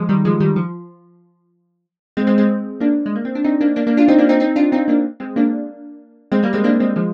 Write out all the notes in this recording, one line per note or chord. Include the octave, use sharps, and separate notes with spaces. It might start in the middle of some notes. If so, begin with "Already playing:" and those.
Already playing: F3 G#3
D#3 G3
F3 G#3
D#3 G3
F3
G#3 C4
G#3 C4
G#3 C4
A#3 D4
G#3
A#3
C4
D4
C4 D#4
A#3 D4
A#3 D4
A#3 D4
D4 F4
C4 D#4
A#3 D4
C4 D#4
C4 D#4
D4 F4
C4 D#4
A#3 D4
G#3 C4
A#3 D4
G#3 C4
G3 A#3
G#3 C4
A#3 D4
G#3 C4
F3 G#3